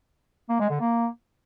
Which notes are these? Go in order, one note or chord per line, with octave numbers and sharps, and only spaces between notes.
A#3
G#3
D3
A#3